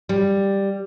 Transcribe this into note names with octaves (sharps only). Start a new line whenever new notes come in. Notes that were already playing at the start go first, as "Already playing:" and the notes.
G3